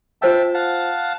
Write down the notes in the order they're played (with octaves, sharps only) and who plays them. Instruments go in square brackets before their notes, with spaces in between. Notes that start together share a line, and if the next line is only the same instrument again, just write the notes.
[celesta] F4 C5 E6 [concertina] E5 G5 A5
[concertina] F5 F#5 A5